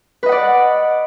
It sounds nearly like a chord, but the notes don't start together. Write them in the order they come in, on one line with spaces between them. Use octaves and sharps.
B4 D#5 F#5 D5